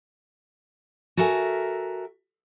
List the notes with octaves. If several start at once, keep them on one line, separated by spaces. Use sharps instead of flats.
F#4 A4 A#4 E5 F#5 G#5